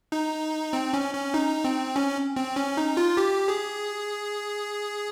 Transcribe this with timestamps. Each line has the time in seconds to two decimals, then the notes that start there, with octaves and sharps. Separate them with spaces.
0.12 D#4
0.73 C4
0.94 C#4
1.14 C#4
1.34 D#4
1.65 C4
1.96 C#4
2.36 C4
2.56 C#4
2.77 D#4
2.97 F4
3.17 G4
3.48 G#4